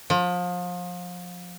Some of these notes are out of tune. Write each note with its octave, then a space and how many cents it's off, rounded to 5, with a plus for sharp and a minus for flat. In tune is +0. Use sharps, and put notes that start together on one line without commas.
F3 +30